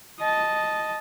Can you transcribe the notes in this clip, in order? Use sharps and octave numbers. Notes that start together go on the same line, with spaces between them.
D#5 A5